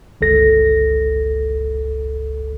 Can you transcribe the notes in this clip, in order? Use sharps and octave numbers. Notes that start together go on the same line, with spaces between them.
G1 C#2 A4 A#6